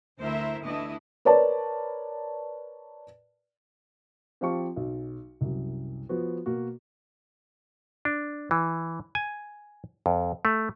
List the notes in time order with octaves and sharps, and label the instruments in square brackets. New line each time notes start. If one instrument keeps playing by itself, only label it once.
[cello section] D2 E4 A#4 C5 E5
D2 E3 A3 D4 E4 D#5
[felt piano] A#4 B4 C#5 D5 A5
[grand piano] F3 C4 G4 F5 A5 C#6
B1
C2 F#2
F3 B3 F#4
B2 A#3 F#4
[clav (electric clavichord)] D4
E3
G#5
F2
A3